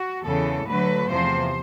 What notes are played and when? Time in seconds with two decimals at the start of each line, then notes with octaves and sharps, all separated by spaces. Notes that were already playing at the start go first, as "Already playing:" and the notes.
Already playing: F#4
0.25 E2 C#3 E3 A4
0.67 D2 D3 F#3 A3 B4
1.08 E2 C3 F3 C5